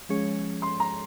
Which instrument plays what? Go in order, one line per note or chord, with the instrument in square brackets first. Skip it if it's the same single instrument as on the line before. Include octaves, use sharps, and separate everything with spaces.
[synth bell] F3 G#3 C#4 G#4 C#5
[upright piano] C6
A#5